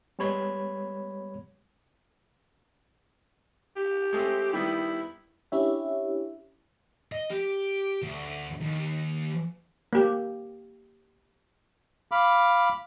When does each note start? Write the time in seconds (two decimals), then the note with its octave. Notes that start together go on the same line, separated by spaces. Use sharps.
0.19 G3 G#3 B3 C#5 B5 G#6
3.76 G4
4.13 G#3 A3 C4
4.53 D#3 G3 B3 E4
5.52 C#4 D4 E4 G4 C#5 E5
7.12 D#5
7.30 G4
8.02 D2
8.61 D#2
9.93 A#3 G4
12.12 F5 B5 D6